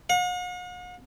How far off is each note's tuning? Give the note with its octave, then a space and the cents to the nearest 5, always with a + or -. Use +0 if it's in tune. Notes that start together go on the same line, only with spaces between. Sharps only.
F#5 -45